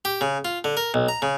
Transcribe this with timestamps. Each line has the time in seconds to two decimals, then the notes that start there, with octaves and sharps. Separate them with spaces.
0.05 G4
0.21 C#3
0.45 F4
0.64 D3
0.77 A#4
0.94 B1
1.08 A#5
1.22 C#3